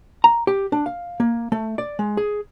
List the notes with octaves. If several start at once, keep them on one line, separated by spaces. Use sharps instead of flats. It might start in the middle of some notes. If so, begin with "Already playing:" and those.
A#5
G4
D4
F5
A#3
A3
D5
G#3
G#4